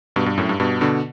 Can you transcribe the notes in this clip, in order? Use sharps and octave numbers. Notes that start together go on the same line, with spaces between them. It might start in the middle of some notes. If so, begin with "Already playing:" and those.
G2 B2
G2
F#2 A2
G2
G2 B2
B2 D3